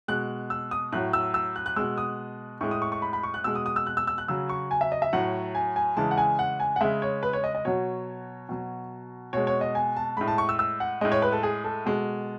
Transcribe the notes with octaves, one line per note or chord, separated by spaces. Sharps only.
B2 G#3 F#6
E6
D#6
A2 F#3 F#6
E6
E6
F#6
F#6
B2 G#3 E6
D#6
A2 G#3 C#6
D#6
C#6
C#6
B5
B5
C#6
F#6
B2 G#3 E6
D#6
D#6
E6
F#6
E6
E6
F#6
C#3 F#3 E6
C#6
G#5
E5
D#5
E5
A2 F#3 F#5
G#5
G#5
C#3 E3 G#3 A5
F#5
G#5
F#5
G#5
F#5
C#3 G#3 E5
C#5
B4
C#5
D#5
D#5
B2 F#3 C#5
B2 F#3
B2 G#3 C#5
C#5
D#5
G#5
A5
A2 G#3 B5
A5
C#6
E6
E6
F#5
A2 G#3 D#5
C#5
B4
A4
G#4
A4
B2 G#3